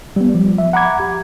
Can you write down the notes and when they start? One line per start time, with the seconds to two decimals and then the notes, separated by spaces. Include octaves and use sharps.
0.16 G3 B3
0.35 F3
0.58 E5
0.73 F#5 A#5 B5 D6 G#6
1.00 G4